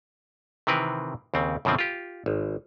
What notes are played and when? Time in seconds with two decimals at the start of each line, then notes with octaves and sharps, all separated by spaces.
0.67 C3 D#3 E3 C4 A#4 B4
1.34 D#2 C#3 C4
1.65 F#2 B2 D3 F3 C4
1.79 F4 G4
2.26 G#1